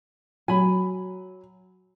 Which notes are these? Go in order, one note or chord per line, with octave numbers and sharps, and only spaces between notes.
F#3 G#5 B5